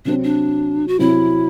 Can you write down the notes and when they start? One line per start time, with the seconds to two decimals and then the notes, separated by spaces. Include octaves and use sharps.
0.05 C3 F#3 C4 D4
0.24 D4
0.88 F#4
0.99 C3 F#3 C4 E4